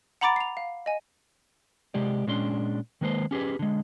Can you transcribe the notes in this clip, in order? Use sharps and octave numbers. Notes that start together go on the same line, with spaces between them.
F#5 A#5 B5 D6 A6 D7
C7 F7
F5
D#5 G#5
C3 G#3 G4 D5
A#2 G#3 C#4 D4 C6
D#3 G#3 A#3 B4 C5
C#4 G4 G#4 B4
D3 G#3